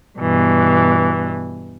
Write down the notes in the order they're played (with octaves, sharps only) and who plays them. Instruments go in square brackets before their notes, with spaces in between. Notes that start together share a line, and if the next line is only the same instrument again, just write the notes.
[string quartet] G2 B2 E3